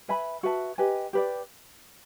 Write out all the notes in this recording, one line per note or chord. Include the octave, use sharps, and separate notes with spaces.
B4 E5 G#5 B5
F#4 B4 E5 A5
G4 B4 D#5 G#5
G4 B4 D5